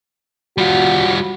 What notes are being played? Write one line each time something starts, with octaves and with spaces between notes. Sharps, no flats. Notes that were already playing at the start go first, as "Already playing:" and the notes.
G3 F4 F#4